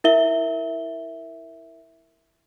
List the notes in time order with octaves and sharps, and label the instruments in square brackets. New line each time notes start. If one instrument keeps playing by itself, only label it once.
[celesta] E4 A#4 E5 G7